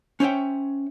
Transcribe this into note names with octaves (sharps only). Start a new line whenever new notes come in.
C#4 C5 C#5 E5 G5